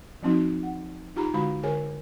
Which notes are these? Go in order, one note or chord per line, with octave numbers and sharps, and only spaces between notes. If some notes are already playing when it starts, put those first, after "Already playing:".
F3 F#3 C4 D#4 F#4
F#5
D#4 F4 G4 A#5 B5
D3 G#3 F#4 F5 B5
D3 G#4 A#4 C#5 G#5